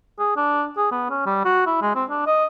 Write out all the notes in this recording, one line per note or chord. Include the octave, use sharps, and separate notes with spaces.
G#4
D4
G#4
B3
C#4
G3
F#4
E4
G#3
C4
D4
D#5